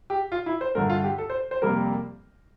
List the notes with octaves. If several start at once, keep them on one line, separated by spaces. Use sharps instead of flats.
G4
F4
E4
C5
G2 D3 A3 A#4
F4
G4
A4
C5
C5
F2 C3 G3 A#3 A#4